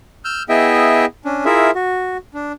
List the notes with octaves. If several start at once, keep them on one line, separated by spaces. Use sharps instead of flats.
E6 F6 G6
B3 E4 G#4 D#5 E5 G5
C#4 D4
E4 F4 G#4 A#4 E5
F#4
D4